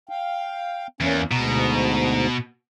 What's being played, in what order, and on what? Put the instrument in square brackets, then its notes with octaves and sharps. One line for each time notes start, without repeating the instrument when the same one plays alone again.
[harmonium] F5 G5
[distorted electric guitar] E2 [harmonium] A#3 C#4
[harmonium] D2 G#2 A#5 [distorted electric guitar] B2